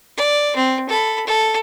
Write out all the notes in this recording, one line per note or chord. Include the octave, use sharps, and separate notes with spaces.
D5
C4
A4 B5
A4